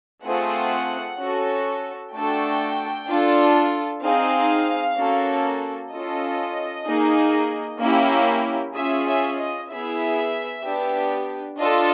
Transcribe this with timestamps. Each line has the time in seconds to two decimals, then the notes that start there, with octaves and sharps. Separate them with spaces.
0.24 A3 C4 F4 G#4 F#5
1.19 C#4 F#4 A4
2.13 A3 D4 F#4 A4 G5
3.08 D4 F4 A4
4.02 C4 D#4 G#4 F5
4.97 A#3 C#4 F#4 A4
5.92 C#4 F4 A4 D#5
6.86 A#3 D#4 G#4
7.80 A#3 C#4 E4 G4
8.75 C#4 F4 G#4 E5
9.07 E5
9.38 D#5
9.70 B3 E4 G#4 E5
10.64 B3 D4 G4
11.59 D4 F4 A4 D#5